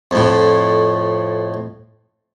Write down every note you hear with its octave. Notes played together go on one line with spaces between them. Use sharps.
F2 A2